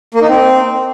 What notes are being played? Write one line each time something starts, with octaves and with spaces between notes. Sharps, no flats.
A#3
D#4
C4